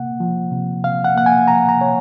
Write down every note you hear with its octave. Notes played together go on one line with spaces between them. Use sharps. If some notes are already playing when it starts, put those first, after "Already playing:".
Already playing: C3 A#3 F#5
F3
C3
C3 F5
F#5
A#3 F#5
G#5
F3 A#5
A#5
C3 C#5